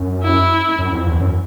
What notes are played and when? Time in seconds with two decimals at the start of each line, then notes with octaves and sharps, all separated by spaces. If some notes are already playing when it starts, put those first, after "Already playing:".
Already playing: F#2
0.23 E4
0.79 F#2
0.92 F2
1.06 E2
1.20 F#2